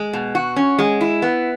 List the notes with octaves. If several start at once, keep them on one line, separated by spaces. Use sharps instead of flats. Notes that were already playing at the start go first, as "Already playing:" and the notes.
Already playing: G#3
B2
F#4
C#4
G#3
E4
B3